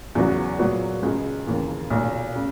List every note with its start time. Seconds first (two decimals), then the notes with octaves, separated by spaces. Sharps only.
0.15 E2 C#3 F#3 B3 F#4
0.59 A#2 F#3 B3 F#4
1.03 C#2 C#3 G#3
1.46 E1 D#2 C#3 E3 A#3
1.90 B1 A#2 A#3
2.36 C#3